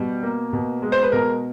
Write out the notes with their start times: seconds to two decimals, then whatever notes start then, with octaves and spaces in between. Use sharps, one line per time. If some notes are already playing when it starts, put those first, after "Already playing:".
Already playing: B2 G3
0.23 A#3
0.53 B2
0.82 G#3
0.92 C5
1.02 B4
1.12 B2 A#4